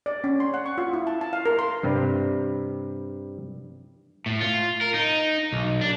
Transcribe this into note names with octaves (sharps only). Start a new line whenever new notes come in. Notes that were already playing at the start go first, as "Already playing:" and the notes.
D5
C#4
C6
F#5
C#6
F4
E4
A5
A5
F5
A#4
C6
G2 C3 G3
A2
F4
A#4
D#4
B1
D4